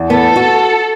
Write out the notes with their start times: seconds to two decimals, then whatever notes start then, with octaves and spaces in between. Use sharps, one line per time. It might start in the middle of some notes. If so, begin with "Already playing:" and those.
Already playing: E2
0.10 B3 A4
0.36 F#4